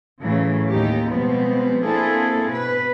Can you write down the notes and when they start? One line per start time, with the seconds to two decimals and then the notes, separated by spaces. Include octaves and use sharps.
0.24 A2 C#3 E3 F#3
0.71 D#2 A2 D#4 G4
1.11 B2 F3 G3 G#3 B3 C4
1.84 A#3 C4 D4 E4 G#4 A4
2.50 B2 B4